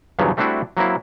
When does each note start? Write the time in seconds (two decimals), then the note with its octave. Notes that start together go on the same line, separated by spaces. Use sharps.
0.19 E2 G2 C#3 F3 F#3
0.37 G3 A3 C4 D4 E4 F#4
0.77 F#3 A#3 C4 E4